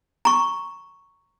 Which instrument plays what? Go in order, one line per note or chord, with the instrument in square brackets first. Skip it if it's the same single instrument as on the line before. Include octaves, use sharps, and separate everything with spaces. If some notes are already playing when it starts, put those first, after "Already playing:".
[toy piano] A#5 C#6